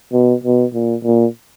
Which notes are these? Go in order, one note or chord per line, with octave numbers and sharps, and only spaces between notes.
B2
B2
A#2
A#2